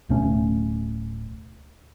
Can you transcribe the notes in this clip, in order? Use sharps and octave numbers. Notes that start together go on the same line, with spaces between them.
D1 B2 A3 C#4